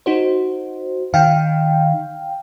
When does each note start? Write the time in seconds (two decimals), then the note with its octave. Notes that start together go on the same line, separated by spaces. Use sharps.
0.06 D#4 F#4 C5
1.14 D#3 F5 G5